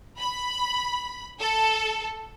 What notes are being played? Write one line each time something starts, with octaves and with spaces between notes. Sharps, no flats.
B5
A4